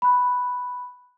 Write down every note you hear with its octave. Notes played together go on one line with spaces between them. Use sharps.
B5 F#6